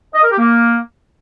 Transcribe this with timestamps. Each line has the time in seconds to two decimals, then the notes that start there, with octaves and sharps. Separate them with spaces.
0.14 D#5
0.22 A#4
0.30 G4
0.38 A#3